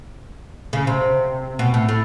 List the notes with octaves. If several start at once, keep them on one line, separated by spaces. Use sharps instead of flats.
C#3
C3
B2
A2
A2